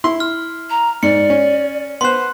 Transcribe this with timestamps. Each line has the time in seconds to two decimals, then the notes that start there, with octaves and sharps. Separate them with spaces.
0.04 E4 C6
0.20 F6
0.70 A#5
1.03 G#2 D5 C#7
1.30 C#4
2.01 B3 C5 C6 F#6